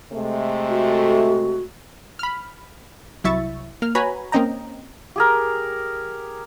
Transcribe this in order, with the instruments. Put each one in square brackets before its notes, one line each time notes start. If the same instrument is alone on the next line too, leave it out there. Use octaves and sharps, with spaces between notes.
[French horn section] C3 G#3 A3
[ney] F#4
[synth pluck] B5 F6
C2 F#3 E4 E5 C#6 A6
A#3 F6
F#4 B4 C#5 G#5 A#5 B5
A#3 C4 C#4 D#5 G5 A#5
[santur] G4 G#4 A#4